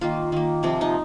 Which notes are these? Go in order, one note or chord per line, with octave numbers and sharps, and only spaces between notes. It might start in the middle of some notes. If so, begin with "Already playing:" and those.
D#3 A#3 F4
D#3 A#3
C3 F3 C4
D#4